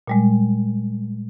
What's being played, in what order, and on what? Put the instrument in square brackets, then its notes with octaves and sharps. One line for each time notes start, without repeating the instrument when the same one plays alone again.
[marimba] A#2 G3 G#3